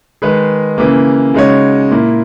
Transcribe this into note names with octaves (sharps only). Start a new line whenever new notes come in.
D#3 G#3 D#4 G#4 B4
C#3 E3 A#3
C#3 G#3 D#4 F#4 C#5
A#2 A#3 E4